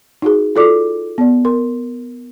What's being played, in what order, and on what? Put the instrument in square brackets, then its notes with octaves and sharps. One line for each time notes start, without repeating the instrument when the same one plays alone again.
[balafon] D#4 F#4 G#4
F4 F#4 A4 D5 D6
B3 D5
A#4 C6